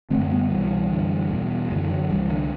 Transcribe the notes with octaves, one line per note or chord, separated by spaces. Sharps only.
F#2 D3 A3 C4
G3 B3
C2 B2 E3 G3
F#2 D3
E2 B2
F#2 D3 E3
E3
D3 F#3
C2 C3 E3 G3
D3